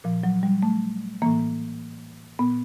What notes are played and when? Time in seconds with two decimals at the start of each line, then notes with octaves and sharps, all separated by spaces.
0.04 A#2 F3
0.23 F#3
0.43 G3
0.63 A3
1.22 A2 E3 A#3
2.39 A#2 B3